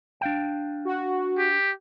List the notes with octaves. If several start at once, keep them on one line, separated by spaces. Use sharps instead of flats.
D4 F5 G5
F#4
G4